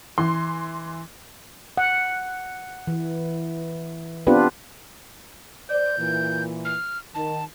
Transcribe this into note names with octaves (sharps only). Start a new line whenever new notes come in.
E3 C6
F#5
E3
B3 C4 D4 F4 G4 B4
C5 D5 G6
A#2 E3
F6
D#3 A5